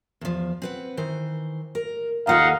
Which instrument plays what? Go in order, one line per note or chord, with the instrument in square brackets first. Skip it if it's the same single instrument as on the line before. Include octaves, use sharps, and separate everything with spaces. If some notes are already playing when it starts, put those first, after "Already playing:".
[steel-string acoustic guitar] E2 F3
C4 B4 F#5
D#3 E3 C5
A#4
[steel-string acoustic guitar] D#2 F4 A4 [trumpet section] D#4 F5 F#5